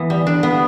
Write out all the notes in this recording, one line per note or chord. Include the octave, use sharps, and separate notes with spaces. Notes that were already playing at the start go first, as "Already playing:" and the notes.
Already playing: E3 B3
G3
D4
B3